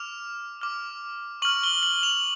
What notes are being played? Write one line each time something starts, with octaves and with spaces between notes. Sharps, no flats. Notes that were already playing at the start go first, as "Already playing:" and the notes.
Already playing: D6 F6 F7
D6 F6
C#6 F6 F#7
G7
F#7
F7